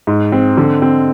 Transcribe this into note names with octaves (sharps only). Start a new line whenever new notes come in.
G#2
C4
D3
C4